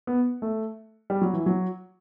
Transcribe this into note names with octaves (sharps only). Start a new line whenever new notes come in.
B3
A3
G3
F#3
E3
F#3